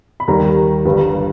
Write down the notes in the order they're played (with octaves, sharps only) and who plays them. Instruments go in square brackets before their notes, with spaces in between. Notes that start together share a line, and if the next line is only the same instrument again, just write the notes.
[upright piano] B5
D#2 D#3 G3 A#5
G1 G2 G3